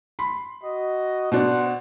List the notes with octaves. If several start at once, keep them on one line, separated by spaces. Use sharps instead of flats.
B5 C6
F#4 D#5
B2 D4 B4 C5 F#5